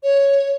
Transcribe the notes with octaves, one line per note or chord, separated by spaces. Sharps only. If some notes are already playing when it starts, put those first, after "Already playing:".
C#5